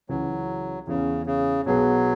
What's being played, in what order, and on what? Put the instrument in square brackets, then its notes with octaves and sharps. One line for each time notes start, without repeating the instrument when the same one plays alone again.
[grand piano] C#2 C#3 E3 C#4 F#4 [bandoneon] F#3
[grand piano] E2 E3 C#4 [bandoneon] C#3
[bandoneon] C#3
[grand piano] B1 B2 G#3 B3 G#4 [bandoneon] F#3